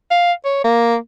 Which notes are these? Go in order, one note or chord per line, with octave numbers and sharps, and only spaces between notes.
F5
C#5
A#3